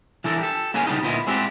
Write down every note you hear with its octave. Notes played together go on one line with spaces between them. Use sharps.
E3 D4 A4 A#4
G4 A4
A#3 B3 C#4 D#4 G#4 G#5
C#3 G3 B3 D4 D#4
D2 A#2 B3 E4 D#5
G#3 C4 D4 E4 F#4 G4